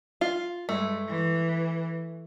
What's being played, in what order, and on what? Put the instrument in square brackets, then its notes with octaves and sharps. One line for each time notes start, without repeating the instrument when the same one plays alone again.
[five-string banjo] F4
[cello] G2 G#3 [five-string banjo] A3
[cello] E3